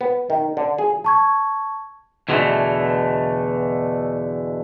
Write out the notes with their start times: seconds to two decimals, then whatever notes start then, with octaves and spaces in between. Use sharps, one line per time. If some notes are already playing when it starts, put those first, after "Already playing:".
0.01 B3
0.30 D#3
0.57 D3
0.79 G#4
1.04 A5 C#6 G#6
2.29 E2 B2 D3 E3 A3